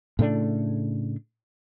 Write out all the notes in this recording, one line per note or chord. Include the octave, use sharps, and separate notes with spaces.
A2 C#3 A3 D4